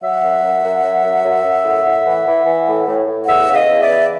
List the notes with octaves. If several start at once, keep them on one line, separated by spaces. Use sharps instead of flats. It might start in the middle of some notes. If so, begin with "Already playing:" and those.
F#3 E5 F#5
F#2
F#2
F#2
F#3
F#2
F#2
F#2
A2
A2
E3
E3
E3
A2
A2
A2
E2 E5 F#5
C#3
D#5 F5
E2
D5 E5
E3